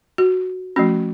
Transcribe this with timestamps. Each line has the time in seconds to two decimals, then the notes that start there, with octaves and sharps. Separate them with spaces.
0.18 F#4
0.76 F3 A3 C#4 F#4